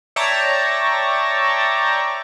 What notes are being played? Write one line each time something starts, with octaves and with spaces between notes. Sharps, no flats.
C#5 D5 E5 G5 A5 A#5